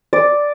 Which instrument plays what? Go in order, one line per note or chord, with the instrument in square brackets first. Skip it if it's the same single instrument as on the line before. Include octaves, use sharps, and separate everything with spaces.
[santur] D5